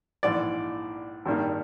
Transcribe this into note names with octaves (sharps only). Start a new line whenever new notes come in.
A#1 G#2 E3 D5
G#1 G2 D#3 G3 A#3